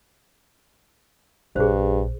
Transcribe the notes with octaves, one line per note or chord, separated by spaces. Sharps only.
A#1 G2 G#4 C5